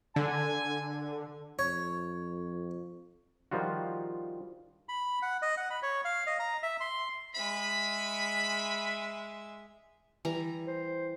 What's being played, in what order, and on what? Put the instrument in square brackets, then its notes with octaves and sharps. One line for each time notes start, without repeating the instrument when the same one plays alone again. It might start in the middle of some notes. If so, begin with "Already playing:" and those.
[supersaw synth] D3 [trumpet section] G#5
[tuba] F2 [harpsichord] C#5
[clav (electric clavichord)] D#3 F3 G3 F4 F#4
[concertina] B5
F#5
D#5
F#5
B5
C#5
F5
D#5
A#5
E5
C6
[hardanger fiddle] G#3 E5 [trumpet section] B5
[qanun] E3 G3 A#5
[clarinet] C5